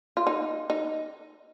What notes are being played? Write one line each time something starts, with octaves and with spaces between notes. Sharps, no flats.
F4
D#4
D#4